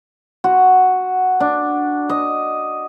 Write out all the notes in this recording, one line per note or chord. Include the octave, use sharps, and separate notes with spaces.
F#4
D4
D#5